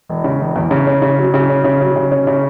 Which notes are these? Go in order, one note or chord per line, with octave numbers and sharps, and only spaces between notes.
E1
C#3
E1
E2
C#3
C#4
C#3
F#3
C#3
C#4
C#3
F#3
C#3
C#4
C#3